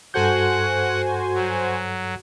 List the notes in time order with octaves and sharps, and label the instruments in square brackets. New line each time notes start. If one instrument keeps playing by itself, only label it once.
[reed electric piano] G2 A4 G6 [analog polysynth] F#4 C5 G#5 [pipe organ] F#5
[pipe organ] F#3